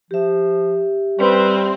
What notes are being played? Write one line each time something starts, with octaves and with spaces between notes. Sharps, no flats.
F3 G4 E5
G3 C4 B4 C5